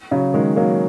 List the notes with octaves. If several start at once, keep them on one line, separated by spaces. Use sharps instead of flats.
C#3 F#3
D#3 G#3
F#3 A#3